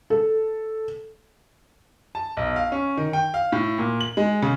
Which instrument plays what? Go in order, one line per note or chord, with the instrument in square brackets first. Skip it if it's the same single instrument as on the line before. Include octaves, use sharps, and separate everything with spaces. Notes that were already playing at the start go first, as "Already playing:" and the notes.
[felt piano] A4
[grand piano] A5
B1
F5
C#4
D#3
G5
F5
A2
A#2
F#7
G#3
C#3